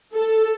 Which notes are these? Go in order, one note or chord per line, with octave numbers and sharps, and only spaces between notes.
A4